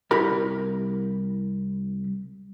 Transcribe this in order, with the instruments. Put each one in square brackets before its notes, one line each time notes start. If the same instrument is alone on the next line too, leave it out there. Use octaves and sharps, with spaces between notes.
[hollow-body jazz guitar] C2 E4 G4 A#4 B5